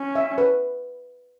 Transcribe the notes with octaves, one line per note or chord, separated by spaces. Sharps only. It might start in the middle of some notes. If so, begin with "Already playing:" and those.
Already playing: C#4
E5
B4